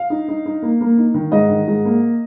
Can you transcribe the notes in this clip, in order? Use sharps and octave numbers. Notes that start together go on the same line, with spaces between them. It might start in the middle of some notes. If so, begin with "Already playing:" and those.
Already playing: F5
D#4
D#4
D#4
A#3
A#3
D#4
D#3
G#2 D#5
D#3
G#2
A#3